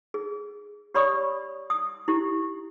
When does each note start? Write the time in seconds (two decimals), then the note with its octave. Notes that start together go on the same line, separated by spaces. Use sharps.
0.14 G#4
0.94 G4 C#5 D5 B5 C#6 D#6
1.70 D#6
2.08 E4 G4